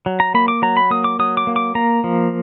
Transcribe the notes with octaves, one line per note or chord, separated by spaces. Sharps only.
F#3
A#5
A#3 B5
D6
F#3 A#5
B5
A#3 D#6
D6
F#3 D#6
D6
A#3
D6
A#3 A#5
F3